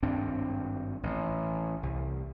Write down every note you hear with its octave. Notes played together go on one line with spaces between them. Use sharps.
G#1 G2 C4 D4
A1
C2